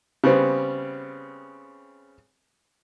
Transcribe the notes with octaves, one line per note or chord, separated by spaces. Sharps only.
C#3 G3 B3 C4